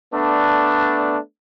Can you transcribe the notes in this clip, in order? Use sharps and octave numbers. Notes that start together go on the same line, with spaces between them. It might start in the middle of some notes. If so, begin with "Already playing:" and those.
A3 B3 D4